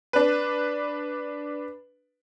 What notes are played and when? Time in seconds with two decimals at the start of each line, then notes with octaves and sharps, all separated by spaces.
0.13 D4 B4